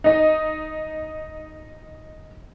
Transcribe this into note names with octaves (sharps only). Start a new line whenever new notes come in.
D#4 D#5